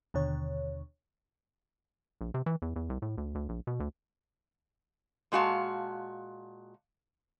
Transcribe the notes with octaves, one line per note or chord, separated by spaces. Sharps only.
D#2 B2 D3 C#5
A#1
C3
E3
E2
E2
C2
A2
D2
D2
A#1
B2
D2
A#2 G#3 F#4 F5 A5